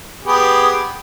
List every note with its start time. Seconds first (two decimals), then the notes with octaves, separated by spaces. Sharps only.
0.24 B3 G4 G#4